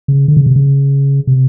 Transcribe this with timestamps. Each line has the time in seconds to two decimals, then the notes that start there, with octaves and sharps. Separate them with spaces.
0.08 C#3
0.28 D3
0.37 C#3
0.46 C3
0.56 C#3
1.27 C3